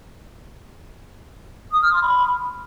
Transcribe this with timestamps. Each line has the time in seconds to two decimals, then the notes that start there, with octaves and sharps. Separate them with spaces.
1.73 D#6
1.83 F6
1.93 C6
2.03 B5